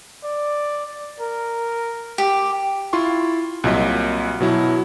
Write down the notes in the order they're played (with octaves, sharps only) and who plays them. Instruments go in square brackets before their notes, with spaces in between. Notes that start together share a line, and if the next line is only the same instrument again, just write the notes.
[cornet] D5
A#4
[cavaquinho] G4
[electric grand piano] E4 F4 C6 C#6
C2 A#2 F#3 D#5 B6
B2 F#3 E4